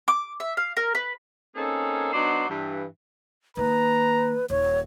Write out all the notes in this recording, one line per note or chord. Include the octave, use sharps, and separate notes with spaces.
D6
E5
F5
A#4
B4
A#3 C4 C#4 D#4 G#4 A4
F#3 B3 D4 D#4 C5 D5
G2 E3
D#3 A#3 B4 A#5
D#1 C#5